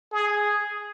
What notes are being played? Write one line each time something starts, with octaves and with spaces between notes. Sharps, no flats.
G#4